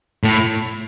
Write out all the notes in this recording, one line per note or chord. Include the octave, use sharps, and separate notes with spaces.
A2